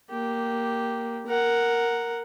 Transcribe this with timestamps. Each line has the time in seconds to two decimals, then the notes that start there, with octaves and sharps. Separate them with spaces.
0.10 A#3 G4
1.27 A#4 F#5